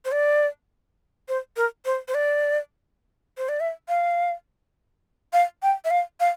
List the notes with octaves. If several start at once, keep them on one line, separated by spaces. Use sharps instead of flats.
C5
D5
C5
A#4
C5
C5
D5
C5
D5
E5
F5
F5
G5
E5
F5
F5